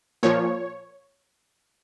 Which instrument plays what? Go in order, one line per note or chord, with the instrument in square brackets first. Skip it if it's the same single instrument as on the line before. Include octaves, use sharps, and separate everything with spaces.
[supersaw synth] A#2 F3 C#5